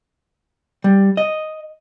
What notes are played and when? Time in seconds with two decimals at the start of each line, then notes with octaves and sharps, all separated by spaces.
0.84 G3
1.17 D#5